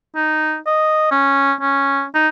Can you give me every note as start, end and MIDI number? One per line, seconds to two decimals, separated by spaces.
0.16 0.57 63
0.67 1.11 75
1.11 1.53 61
1.61 2.05 61
2.15 2.28 63